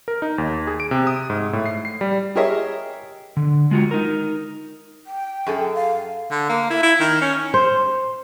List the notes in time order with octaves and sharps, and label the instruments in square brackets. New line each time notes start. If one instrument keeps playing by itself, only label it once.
[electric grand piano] A#4
D#4
D#2
G#4
D7
C3
D#6
G#2
A2
C7
C7
G3
[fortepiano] G4 G#4 A#4 C#5 D#5 E5
[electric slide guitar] D3
G#3 F4 F#4
D#4 A#4
[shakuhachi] G5
[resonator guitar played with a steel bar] F#2 G#4 A4
[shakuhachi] F5
[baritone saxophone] D3
A#3
E4
E4
D#3
C#4
[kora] C5